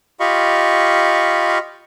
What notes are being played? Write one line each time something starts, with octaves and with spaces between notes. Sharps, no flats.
F4 G4 D#5 F5 B5 C#6